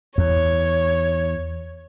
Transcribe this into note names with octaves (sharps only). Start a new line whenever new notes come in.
E2 C#5